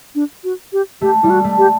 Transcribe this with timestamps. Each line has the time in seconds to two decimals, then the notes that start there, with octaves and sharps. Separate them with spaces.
0.15 D4
0.44 F#4
0.73 G4
1.01 A3 G4
1.23 G3 E4
1.30 F#4
1.44 A3
1.58 G4